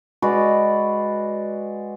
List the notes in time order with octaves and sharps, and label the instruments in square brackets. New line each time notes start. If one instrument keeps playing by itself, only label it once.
[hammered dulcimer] G#3 F#4 B4 D5